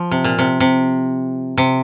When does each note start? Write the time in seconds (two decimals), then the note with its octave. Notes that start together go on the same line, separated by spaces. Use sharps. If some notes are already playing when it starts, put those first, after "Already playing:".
Already playing: F3
0.11 C3
0.24 A#2
0.39 C3
0.60 C3
1.57 C3